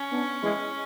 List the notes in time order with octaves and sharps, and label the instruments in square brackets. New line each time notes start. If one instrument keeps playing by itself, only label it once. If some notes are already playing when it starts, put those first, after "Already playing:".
Already playing: [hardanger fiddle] C#4
[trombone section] B3 D4
E3 G#3